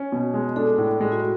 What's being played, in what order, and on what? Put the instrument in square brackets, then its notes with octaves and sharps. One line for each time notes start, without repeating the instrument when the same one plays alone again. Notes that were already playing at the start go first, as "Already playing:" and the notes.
Already playing: [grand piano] C#4
B2
G#3
[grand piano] D4 [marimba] A4
[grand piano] A2
G#3
[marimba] F#4